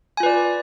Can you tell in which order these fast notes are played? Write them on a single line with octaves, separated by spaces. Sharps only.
G#5 F4 B4 D5